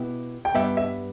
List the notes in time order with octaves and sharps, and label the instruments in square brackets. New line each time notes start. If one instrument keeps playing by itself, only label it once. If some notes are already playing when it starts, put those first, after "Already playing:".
Already playing: [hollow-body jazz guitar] B2 B3 E4 G4
[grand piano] G5
[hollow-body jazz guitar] G2 G3 B3 G4 [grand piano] E5
[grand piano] E5